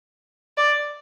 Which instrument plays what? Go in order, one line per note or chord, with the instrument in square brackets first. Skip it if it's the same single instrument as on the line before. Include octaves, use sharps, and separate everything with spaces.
[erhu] D5